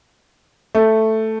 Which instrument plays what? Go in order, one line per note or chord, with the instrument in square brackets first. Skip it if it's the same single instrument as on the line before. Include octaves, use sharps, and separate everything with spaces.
[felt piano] A3